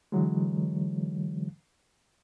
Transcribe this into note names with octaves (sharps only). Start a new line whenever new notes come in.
D3 E3 F#3 G#3